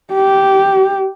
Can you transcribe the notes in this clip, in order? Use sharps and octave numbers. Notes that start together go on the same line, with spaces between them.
G4